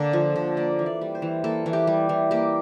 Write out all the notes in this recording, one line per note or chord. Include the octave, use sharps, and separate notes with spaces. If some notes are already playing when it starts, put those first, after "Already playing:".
Already playing: D3 A#3
F3
D3
A#3 D5
E3
D5
G3
C5
E3
A#3 A4
E3
G4
G3
E3
A#3 G4